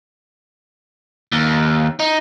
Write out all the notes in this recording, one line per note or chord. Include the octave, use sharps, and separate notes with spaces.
D#2
D#4